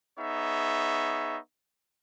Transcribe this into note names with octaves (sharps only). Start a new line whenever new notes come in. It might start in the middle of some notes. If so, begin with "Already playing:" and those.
B3 D#4 G#4 C#5 E5